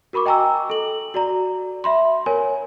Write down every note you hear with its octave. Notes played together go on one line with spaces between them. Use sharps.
F#4 A#4 B5 C#6 D6
D#5 G5 G#5 A#5 C#6 E6
A4 F#7
F#4 D5 A#5
E5 B5 C6
A#4 C#5 G#5